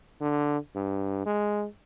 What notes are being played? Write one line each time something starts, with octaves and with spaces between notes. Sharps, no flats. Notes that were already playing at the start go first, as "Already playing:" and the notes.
D3
G2
G#3